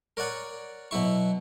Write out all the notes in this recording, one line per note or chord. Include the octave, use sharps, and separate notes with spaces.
A#4 C#5 D5 F#5 G#5
B2 F#3 E4 C#6